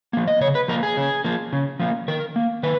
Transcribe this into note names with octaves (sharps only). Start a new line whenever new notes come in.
F3 A#3
D#5
C#3 C#5
B4
F3 A#3 A#4
G#4
C#3
F3 A#3
C#3
F3 A#3
D#3 A#4
A#3
D#3 B4